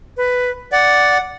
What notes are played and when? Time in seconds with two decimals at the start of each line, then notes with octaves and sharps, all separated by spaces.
0.17 B4
0.72 D5 F#5